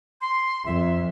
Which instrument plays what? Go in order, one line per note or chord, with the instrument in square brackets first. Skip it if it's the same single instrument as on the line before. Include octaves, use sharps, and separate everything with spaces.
[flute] C6
[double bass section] F2 [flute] E5